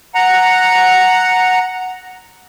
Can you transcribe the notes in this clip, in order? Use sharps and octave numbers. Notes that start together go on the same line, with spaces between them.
F#5 A#5